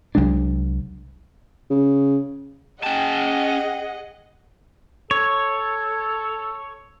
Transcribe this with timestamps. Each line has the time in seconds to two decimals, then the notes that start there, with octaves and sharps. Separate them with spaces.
0.15 C2 F#3 G#3 D4
1.70 C#3
2.83 C#4 G#4 D#5 F#5 G5 A5
5.11 A4 C#5